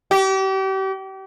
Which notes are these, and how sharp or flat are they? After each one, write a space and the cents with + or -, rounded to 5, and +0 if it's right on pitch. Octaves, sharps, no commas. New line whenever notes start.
G4 -35